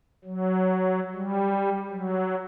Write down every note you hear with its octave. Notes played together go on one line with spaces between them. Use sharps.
F#3
G3
F#3